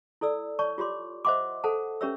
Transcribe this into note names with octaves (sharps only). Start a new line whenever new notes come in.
E4 A4 D5 E6
C#5 D5 A5 C#6
F4 G4 C#5 C6 D6
C5 D#5 E5 F#5 C6 D6
A4 C5 F#5 A5
C#4 G4 B4 C#5 E5 E6